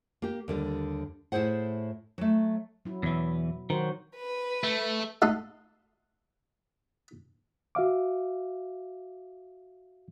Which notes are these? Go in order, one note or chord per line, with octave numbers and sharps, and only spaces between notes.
A#3 G4
D#2 D3 G3
A2 E4 G#4 C5 F#5
F#3 A3
F#3 E4
E2 B2 E3 E5
D#3 F#3 F#4 C5
B4
A3
A3 D#4 A4 F#5 C6
F#4 E5 F5 D6